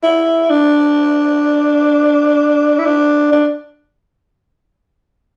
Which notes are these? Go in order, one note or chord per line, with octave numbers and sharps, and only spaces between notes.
E4
D4
E4
D4
D4